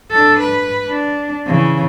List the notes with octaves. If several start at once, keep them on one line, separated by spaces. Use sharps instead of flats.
D4 A4
B4
D4
C#3 E3